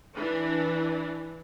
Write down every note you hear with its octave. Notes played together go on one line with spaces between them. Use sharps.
E3 D4